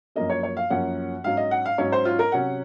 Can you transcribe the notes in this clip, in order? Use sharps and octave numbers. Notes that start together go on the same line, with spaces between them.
F#2 F3 A#3 C#4 D#5
C#5
C#5
F5
F#2 F3 A#3 C#4 F#5
G#2 F#3 C#4 F5
D#5
F#5
F5
G#2 F#3 C#4 C#5
C5
F4
A#4
C3 F#3 C#4 F#5